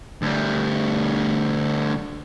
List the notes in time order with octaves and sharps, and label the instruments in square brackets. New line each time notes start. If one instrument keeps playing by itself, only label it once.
[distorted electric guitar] D2 G3